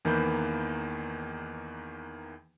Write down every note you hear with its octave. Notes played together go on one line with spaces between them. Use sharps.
E2 D#3 E3 A#3 B5 G6